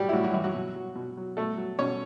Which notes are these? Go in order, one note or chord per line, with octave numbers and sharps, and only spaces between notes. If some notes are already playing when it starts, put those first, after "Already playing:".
Already playing: A2 F#3 G3 G4
E4
A2 F#3 F#4
F#3 F#4
E3 F#3 E4
F#3 F#4
B2
F#3
B2
F#3
B2 A3 A4
F#3
B2 C#4 C#5